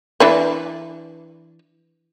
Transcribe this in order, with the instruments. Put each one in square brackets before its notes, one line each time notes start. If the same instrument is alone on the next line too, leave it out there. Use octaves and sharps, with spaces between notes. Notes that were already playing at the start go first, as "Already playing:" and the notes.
[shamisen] E3 D4 B4